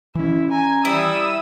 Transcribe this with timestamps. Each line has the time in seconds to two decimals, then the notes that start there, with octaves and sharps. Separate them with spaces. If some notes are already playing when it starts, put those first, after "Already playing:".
0.15 E3 C#4 E4
0.51 G#5 A#5
0.85 G3 E4 D#6 E6